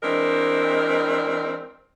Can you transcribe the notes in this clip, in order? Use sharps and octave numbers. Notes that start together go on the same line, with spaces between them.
E3 G#3 C4 D4 A#4